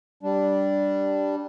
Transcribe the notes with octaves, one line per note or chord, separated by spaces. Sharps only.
G3 D4